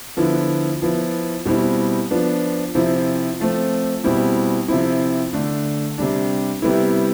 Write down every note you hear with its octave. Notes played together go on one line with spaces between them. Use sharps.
D3 F3 B3 E4
F3 B3 E4
B2 G3 C4 E4
F3 B3 D4
C3 F3 C4 E4
F3 A3 C4
B2 G3 C4 E4
C3 F3 C4 E4
D3 A3 D4
C3 G3 D4
C3 G3 B3 E4